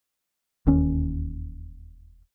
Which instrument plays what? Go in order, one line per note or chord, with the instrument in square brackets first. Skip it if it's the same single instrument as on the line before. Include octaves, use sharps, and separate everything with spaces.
[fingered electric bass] E1 D#2 D#3 C#4